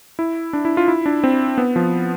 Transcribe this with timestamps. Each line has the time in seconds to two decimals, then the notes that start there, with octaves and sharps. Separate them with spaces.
0.19 E4
0.53 D4
0.65 E4
0.77 F4
0.88 E4
1.06 D4
1.24 C4
1.58 B3
1.76 F3